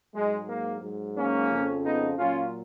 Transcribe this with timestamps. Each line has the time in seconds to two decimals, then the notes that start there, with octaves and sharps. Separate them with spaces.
0.14 G#2 F#3 G#3
0.47 A#3
0.81 G#2 F#3
1.15 A#3 C#4
1.50 F2 C#3 F3
1.83 B3 D#4
2.17 A#2 F#3 C#4 F4